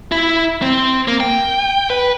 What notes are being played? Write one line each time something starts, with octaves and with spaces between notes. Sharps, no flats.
E4
C4
A#3
G5
B4